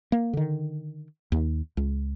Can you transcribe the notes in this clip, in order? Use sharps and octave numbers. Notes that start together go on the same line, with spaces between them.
A#3
D3 D#3
D#2
C#2